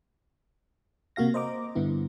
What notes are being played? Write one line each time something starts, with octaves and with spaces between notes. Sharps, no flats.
C3 A#3 F#4 F5 A#6
C5 D#5 A#5 D6
G2 D3 B3 E4